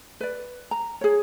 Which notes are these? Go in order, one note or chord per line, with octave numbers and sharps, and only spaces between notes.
B4 D5
A#5
G#4 C#5